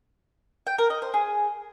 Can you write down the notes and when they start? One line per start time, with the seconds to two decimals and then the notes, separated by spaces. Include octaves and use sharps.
0.67 G5
0.78 A#4
0.90 D#5
1.02 C5
1.14 G#4